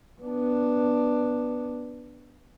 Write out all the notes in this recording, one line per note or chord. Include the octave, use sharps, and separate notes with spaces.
B3 D4